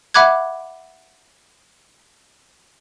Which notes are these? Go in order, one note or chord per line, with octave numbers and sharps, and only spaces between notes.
E5 F#5 B5 D6 F#6 G#6